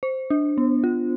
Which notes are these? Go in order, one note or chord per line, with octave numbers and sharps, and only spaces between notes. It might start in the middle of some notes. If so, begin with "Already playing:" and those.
C5
D4
B3
F4